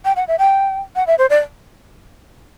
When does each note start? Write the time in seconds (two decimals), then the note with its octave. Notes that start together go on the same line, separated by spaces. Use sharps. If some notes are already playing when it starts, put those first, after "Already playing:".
0.05 G5
0.16 F#5
0.28 E5
0.39 G5
0.96 F#5
1.07 E5
1.18 C5
1.30 D5